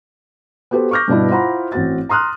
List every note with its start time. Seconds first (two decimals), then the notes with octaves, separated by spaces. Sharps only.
0.71 B3 F#4 G4 A4 C5
0.91 C#6 D6 F6 G6 A#6
1.08 G2 B2 D4 E4
1.30 E4 F4 C5 F#5 A#5 B5
1.72 A1 C4 F#4 A6
2.09 A#5 C6 D#6 F6 F#6